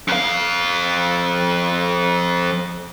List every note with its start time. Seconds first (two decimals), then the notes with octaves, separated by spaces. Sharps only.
0.08 F2 F5